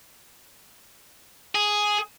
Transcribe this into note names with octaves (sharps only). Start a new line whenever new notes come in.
G#4